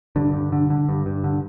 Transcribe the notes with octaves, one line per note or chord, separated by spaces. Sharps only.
G2 D3
G2
D3
D3
G2
G2
D3